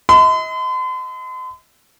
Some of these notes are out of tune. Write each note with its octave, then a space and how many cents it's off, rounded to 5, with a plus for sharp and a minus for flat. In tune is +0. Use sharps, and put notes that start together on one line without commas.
D#5 +40 C6 -45